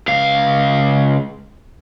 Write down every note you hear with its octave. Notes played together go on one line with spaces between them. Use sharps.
C#2 F5